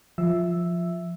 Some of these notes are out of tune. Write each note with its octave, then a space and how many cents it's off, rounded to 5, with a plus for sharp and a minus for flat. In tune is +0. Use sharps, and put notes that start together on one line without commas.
F3 +0 E5 +0 E6 +0